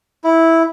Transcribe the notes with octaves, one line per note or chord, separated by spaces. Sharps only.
E4